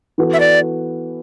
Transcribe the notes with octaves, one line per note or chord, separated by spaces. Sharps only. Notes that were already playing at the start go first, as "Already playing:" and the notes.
E3 B3 F#4 A4
E5
D5